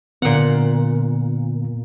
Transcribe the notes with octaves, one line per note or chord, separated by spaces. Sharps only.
A#2 D3 B3 F#5